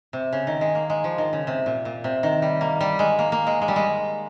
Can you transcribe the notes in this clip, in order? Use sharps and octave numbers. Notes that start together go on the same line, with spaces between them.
C3
C#3
D#3
G#3
A#3
G#3
F3
D#3
C#3
C3
A#2
A#2
C3
D#3
G3
A#3
G3
G#3
A#3
A#3
G#3
G#3
G3
G#3